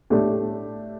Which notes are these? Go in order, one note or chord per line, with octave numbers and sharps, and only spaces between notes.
A2 A3 D4 G4